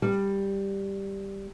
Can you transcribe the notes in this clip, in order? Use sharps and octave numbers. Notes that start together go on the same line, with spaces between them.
G3